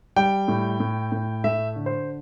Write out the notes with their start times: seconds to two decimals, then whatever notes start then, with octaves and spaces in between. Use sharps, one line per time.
0.16 G3 G5
0.48 A2
0.80 A2
1.12 A2
1.44 A3 E5
1.76 D3
1.86 C5